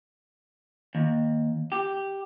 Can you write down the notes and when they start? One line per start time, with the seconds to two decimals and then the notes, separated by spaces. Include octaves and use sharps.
0.95 D#2
1.72 G4